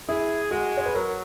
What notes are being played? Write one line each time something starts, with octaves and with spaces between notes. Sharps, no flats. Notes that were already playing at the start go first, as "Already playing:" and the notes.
E4 G#4
G#3 F#4
C#5
B4
F#3 A#4